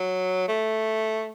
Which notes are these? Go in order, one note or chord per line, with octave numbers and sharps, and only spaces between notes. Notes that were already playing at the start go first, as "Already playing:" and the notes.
Already playing: F#3
A3